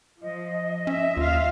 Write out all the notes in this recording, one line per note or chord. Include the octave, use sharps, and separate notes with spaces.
F3 D#5
C#4 E5
D#2 F4 F5